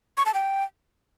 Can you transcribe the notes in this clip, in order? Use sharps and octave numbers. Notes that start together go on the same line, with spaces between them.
C#6
A5
G5